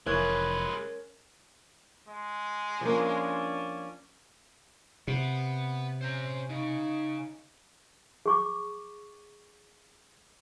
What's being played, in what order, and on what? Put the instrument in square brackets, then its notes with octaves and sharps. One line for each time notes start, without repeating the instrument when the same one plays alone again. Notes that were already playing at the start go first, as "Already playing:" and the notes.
[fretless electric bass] F1 E3 [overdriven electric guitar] G#3 B4 [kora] C#4 [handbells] A#4 F#6 G#6
[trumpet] G#3
[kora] F3 A#3 [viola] C#4 D4
[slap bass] C3 [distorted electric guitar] B3
[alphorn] C#4 [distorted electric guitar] C5 A#5
[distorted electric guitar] C#3 [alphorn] D#4
[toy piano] G#4 C#6 D6